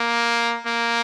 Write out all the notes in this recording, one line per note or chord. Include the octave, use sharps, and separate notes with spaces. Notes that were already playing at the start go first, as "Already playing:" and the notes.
Already playing: A#3
A#3